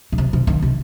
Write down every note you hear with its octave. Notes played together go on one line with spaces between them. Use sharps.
A#2
C3
C3
D#3
C3